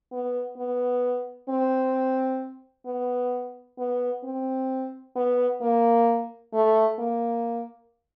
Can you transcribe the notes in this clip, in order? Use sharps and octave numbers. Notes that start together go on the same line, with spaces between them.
B3
B3
C4
B3
B3
C4
B3
A#3
A3
A#3